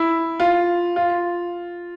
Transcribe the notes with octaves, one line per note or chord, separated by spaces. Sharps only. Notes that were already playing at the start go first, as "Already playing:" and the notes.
Already playing: E4
F4
F4